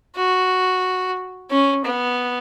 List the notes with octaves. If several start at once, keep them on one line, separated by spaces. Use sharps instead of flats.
F#4
C#4
B3